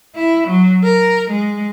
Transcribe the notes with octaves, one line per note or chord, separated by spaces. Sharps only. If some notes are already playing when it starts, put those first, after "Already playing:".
E4
F#3
A#4
G#3